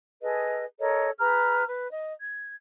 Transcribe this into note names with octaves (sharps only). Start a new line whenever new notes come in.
G#4 A4 B4 D#5
A4 A#4 C#5 D#5
G#4 B4 A#5 F6
B4
D#5
G#6